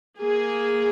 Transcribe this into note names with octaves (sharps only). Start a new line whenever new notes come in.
A#3 G#4